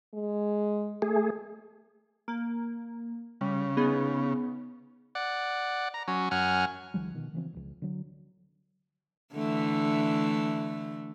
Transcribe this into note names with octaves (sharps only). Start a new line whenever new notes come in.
G#3
A3 G#4
A#3
C#3 G3
B3 D#4 G#4
D5 F#5
A#5
F#3 C#4
F#2 F#5 G#5 F6
C#2 D#3 F3 G3
B2 D#3 F3
C#3 E3 F3 C4
D#1 C#2
D3 F#3
D3 E3 A3